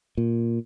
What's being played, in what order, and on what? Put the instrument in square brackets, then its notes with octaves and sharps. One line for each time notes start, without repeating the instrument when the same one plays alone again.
[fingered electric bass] A#2